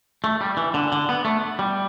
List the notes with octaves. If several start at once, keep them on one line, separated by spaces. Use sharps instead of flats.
A3
G3
E3
D3
D3
B3
A3
G3